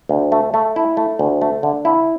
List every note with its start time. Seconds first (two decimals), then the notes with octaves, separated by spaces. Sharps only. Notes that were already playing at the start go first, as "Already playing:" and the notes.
0.09 D2
0.32 A3
0.54 A3
0.76 E4
0.97 A3
1.19 D2
1.42 A3
1.63 D3
1.85 E4